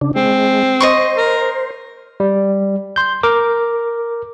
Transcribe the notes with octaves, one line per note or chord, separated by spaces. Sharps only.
C#3 D4
G#3 C4
C5 D#5 C6 C#6
A#4
G3
C6 G6
A#4 D6